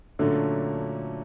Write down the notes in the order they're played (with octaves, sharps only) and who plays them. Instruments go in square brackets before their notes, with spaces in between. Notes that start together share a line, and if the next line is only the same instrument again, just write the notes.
[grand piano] A#2 F#3 A3 C#4 [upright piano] D3